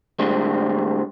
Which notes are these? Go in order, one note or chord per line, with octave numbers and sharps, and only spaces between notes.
A2 D3 G3 G#3 C4